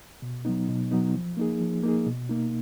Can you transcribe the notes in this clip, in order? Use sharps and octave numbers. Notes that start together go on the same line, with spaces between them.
B2
F#3 B3 D#4
B2
F#3 B3 D#4
F3
A#3 D#4 G#4
F3
A#3 D#4 G#4
B2
A#3 D#4